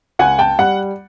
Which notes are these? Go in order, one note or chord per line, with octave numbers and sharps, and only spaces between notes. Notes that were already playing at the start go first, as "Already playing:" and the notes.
C#2 F#5 G#5
G5 A5
G3 F#5